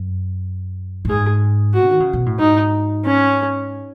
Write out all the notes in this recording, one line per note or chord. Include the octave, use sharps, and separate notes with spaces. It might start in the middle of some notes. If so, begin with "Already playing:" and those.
Already playing: F#2
A2
G#2 G#4
F#4
D#3
C#3
B2
A2
G#2 D#4
C#4